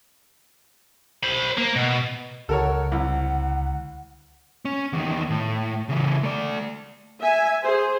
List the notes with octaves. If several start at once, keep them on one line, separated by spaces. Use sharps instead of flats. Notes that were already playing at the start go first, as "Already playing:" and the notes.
C5 B5
A#3
B2
C#2 D3 A4 A#4 C#5 F#5
C2
C#4
E2 D#3
A2
C#3 E3
A3 D5
E5 G#5
G#4 C5